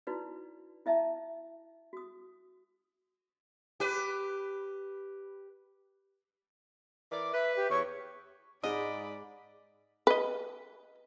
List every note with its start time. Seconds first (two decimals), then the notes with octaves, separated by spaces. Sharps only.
0.07 D#4 E4 F#4 B4 D5
0.86 E4 D#5 E5 A5
1.93 F#4 D#6
3.80 G4 B4
7.11 E3 A#4 D5
7.33 B4 E5
7.56 G4
7.69 E2 C#5 C#6
8.63 G#2 G#3 D5 D#5 B5
10.07 B4 D#5